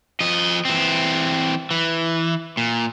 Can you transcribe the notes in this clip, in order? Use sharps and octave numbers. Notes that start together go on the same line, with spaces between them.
F3 D#5
E3 C4
E3
A#2